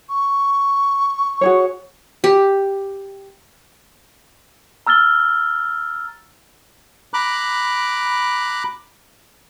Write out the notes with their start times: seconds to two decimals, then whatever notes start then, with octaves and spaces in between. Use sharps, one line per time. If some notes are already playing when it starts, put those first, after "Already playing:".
0.09 C#6
1.41 F#4 G#4 C#5
2.24 G4
4.87 A#5 E6 F6 A6 G7
7.14 A#5 B5 D6 F#6